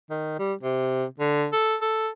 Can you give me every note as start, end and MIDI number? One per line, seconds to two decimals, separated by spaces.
0.10 0.38 51
0.39 0.53 55
0.63 1.05 48
1.20 1.47 50
1.53 1.76 69
1.81 2.09 69